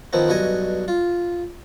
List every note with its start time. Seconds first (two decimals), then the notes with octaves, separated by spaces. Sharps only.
0.13 D#3 F3 B3 C4
0.28 B1 G2 F#4 D#5 G#5
0.88 F4